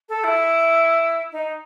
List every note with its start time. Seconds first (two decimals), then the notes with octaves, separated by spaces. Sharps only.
0.09 A4
0.24 E4
1.32 D#4